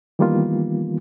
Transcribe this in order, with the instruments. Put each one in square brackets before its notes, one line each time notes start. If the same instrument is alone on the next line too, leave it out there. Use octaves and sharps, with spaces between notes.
[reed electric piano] D#3 E3 G3 A#3 B3 F4